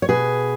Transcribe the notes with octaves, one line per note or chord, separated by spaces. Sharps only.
C#5
B2 G#4 B4